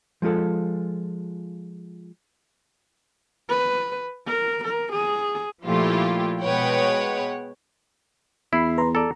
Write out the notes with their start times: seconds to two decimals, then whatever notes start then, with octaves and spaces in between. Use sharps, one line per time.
0.22 F3 G#3 F4 A4
3.49 B4
4.27 A#4
4.64 A#4
4.93 G#4
5.64 A#2 F3 A3 E4 F4 G4
6.41 B2 G#3 B4 C#5 F#5 G5
8.53 E2 E4 B5 C7
8.78 B4 A#5 C6
8.95 A4 D5 A#5